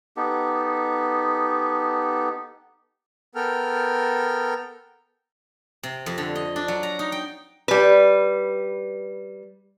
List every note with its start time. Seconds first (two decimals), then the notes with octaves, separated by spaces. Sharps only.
0.17 B3 D#4 G4 A4
3.35 B3 A4 A#4 G5 F6
5.83 C3
6.06 F2
6.18 D3
6.36 D#5
6.56 D4
6.68 F#3
6.83 A#5
6.99 D#4
7.12 G5
7.68 G3 B4